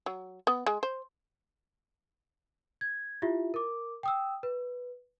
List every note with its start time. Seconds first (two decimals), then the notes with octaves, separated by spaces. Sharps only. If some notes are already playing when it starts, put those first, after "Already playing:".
0.06 F#3
0.47 B3
0.66 G#3
0.83 C5
2.81 G#6
3.22 E4 F4 G4 E5
3.54 A#4 D6
4.03 G5 D#6 E6
4.43 B4